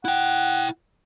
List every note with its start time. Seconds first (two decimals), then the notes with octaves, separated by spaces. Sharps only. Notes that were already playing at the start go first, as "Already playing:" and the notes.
0.05 E4 F#5 G5